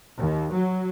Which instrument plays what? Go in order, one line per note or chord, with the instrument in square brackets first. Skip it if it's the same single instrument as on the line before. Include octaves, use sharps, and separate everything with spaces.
[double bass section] D#2
F#3